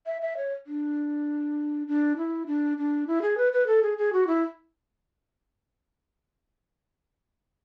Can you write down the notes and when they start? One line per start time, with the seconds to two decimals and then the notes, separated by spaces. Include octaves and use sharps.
0.06 E5
0.22 E5
0.37 C#5
0.67 D4
1.87 D4
2.17 E4
2.47 D4
2.78 D4
3.07 E4
3.22 G#4
3.38 B4
3.53 B4
3.67 A4
3.83 G#4
3.98 G#4
4.13 F#4
4.27 E4